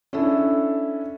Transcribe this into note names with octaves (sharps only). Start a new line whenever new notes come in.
C#4 D4 E4 A4